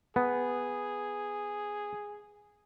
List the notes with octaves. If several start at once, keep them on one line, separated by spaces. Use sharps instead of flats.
B3 G#4